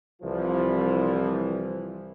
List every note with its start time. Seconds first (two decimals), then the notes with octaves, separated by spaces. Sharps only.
0.22 C2 E3 F3